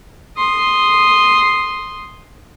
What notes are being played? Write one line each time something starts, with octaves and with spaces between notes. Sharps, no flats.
C6 D#6